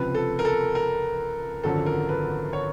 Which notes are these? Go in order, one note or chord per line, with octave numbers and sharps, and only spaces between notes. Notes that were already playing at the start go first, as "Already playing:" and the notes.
Already playing: C#2 C3 F3 B4
A4
A#4
A4
A#4
G#1 F#2 D3 F3 A4
A#4
B4
C#5